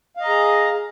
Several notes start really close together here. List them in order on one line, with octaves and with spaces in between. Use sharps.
F5 D#5 A#5 G#4